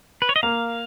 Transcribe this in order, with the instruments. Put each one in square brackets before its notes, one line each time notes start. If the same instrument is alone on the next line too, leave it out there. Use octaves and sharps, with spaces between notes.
[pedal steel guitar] B4
C#5
D#5
[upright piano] A#3 [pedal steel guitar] F5